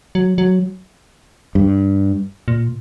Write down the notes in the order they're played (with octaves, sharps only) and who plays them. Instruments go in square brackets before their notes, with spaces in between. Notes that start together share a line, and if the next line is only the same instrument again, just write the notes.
[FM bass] F#3
F#3
[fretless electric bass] G2
[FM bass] A#2